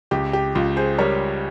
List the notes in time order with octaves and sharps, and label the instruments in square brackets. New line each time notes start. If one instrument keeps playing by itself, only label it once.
[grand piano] C#2 [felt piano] G4
[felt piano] G4
[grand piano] C#2 [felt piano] F4
[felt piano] G#4 C5
[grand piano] G3 [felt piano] A#4 C#5